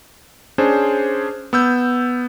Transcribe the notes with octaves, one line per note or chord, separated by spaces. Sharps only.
C#4 D4 G#4 C5
B3 E6 G6